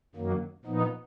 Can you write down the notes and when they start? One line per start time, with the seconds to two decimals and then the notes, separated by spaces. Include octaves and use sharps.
0.15 F#2 D#3 F#3 A#3
0.65 A#2 F3 B3 D#4